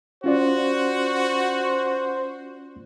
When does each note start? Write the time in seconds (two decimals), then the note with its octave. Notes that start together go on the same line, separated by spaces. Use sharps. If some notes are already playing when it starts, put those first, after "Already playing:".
0.24 C#4 F4 F#4 C5 D5